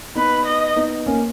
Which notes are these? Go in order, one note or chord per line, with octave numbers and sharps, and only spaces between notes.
B3 D#4 B4
D#5
B3 D#4
A#3 C#4